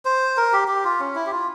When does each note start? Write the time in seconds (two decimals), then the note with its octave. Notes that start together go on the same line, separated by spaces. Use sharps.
0.05 C5
0.37 A#4
0.53 G4
0.68 G4
0.85 F4
1.00 C#4
1.15 E4
1.26 G4
1.31 F4